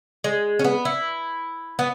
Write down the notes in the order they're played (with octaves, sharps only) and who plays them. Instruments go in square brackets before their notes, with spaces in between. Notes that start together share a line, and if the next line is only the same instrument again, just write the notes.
[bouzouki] G#3
C#4
B3
E4
B3